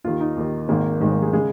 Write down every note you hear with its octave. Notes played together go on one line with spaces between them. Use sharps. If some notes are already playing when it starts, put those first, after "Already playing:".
D#2 D#3 F4
D#4
D#2 D#3
G#1 G#2 D#3 A#3
G#1 G#2 D#3 G#3
A#3
G#3
C#3 G#3